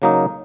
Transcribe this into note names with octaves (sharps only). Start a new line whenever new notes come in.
C#3 F#3 A#3 D#4